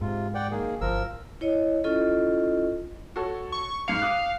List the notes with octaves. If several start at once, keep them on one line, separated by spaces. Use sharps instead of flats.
G#2 C3 F4
D5 F#5 G5
D#3 A#3 G#4
G1 F3 A#4 E6
E4 C#5 D#5
C#4 E4 F4 A4 D#5
F#4 A4 C#5
C#6
G#2 F5 C#7
D6 D#6 F#6